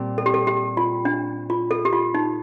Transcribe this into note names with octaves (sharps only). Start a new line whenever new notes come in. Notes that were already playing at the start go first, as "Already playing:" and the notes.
Already playing: A#2 G3 C4
A4
G4
A4
G4
F4
D4
F4
A4
G4
F4
D#4